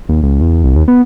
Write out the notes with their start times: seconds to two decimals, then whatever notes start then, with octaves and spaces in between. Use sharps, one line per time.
0.09 D#2
0.23 C#2
0.41 E2
0.64 C2
0.76 D#2
0.88 B3